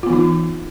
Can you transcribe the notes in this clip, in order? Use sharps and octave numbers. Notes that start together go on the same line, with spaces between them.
E3 B3 D#4 F4